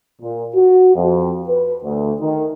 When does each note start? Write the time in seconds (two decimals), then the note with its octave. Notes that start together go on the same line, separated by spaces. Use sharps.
0.22 A#2
0.55 F#4
0.95 F2
1.48 B4
1.84 D2
2.20 D#3